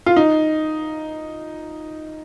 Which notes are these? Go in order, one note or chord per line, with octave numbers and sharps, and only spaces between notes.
F4
D#4